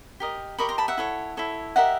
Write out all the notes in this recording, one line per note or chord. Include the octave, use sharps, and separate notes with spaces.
G4 A#4 D#5
G4 A#4 D#5 B5 C#6
A#5 C6
A5 B5
E5 F#5
E4 A4 C#5
E4 A4 C#5
G4 A#4 D#5 E5 F#5